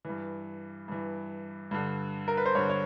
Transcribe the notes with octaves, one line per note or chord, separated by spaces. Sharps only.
G2 E3
G2 E3
G2 D3
A#4
B4
C5
G2 D3 C#5
C#5